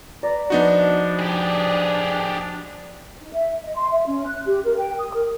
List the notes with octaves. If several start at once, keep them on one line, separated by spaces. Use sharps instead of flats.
B4 D5 A#5
F3 B3 D4 D#4 F#4
G4 G#4
D#4
E5
D#5
C6
E5
C#4
F#6
G4
A#4
G5
D#6
A#4